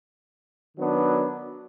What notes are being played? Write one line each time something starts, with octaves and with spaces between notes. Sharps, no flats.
D#3 F#3 B3 D4